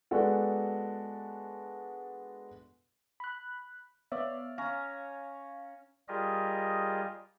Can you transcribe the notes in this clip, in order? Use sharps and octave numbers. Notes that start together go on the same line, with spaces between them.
G#3 B3 D4 F#4 A4
B5 F#6
B3 C#5 D5 E5 F5
C#4 C#5 F5 A#5
G3 F4 G4 G#4 A#4 D#5